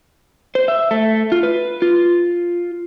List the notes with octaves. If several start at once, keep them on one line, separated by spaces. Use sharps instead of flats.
C5
E5
A3
F4
B4
F4